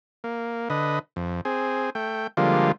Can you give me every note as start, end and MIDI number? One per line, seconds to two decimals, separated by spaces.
0.24 0.69 58
0.70 0.99 50
0.70 0.99 71
0.70 0.99 75
1.16 1.41 41
1.45 1.90 60
1.45 1.90 68
1.95 2.27 57
1.95 2.27 79
2.37 2.72 50
2.37 2.72 53
2.37 2.72 55
2.37 2.72 56
2.37 2.72 58
2.37 2.72 65